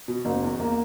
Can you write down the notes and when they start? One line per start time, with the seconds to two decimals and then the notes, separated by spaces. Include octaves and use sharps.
0.08 B2
0.25 F#1
0.43 E2
0.60 A#3